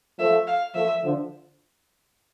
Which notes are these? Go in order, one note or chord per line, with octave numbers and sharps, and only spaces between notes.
F3 A3 E5
F5
F3 A3 E5
D3 F3